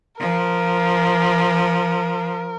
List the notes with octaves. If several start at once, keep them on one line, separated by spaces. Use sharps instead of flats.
F3 A#4